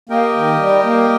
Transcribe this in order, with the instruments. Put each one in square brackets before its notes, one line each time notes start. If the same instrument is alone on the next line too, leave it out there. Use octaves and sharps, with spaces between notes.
[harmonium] A#3 [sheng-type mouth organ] G4 A#4 D#5 G5
[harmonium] D#3
G3
A#3